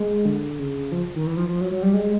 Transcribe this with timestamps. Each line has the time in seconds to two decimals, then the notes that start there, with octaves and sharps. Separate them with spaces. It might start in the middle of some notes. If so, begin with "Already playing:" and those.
Already playing: G#3
0.25 D3
0.59 C#3
0.92 F3
1.15 D#3
1.27 E3
1.37 F3
1.48 F3
1.61 F#3
1.71 F#3
1.83 G3
1.94 G#3